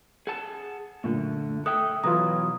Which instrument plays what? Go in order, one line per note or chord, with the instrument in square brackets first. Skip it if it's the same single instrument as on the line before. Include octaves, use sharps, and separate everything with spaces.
[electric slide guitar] G#4 F#5 A5
[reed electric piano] F#2 A#2 [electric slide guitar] D3 A3
[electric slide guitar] A4 E5 G5 [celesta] D#6 [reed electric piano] F#6
[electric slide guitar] B2 E3 F#3 [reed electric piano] F4 B4 A#5 [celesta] D#6